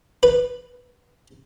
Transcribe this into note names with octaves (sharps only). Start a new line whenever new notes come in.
B4